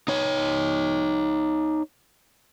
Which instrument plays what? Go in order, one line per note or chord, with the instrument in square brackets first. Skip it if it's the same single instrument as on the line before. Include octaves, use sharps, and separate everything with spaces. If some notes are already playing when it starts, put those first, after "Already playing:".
[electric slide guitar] D#4 C#5